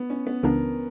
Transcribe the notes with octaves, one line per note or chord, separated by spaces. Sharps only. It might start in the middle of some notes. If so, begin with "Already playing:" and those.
Already playing: B3
C#4
B3
C#2 C#3 E3 B3 D4 A#4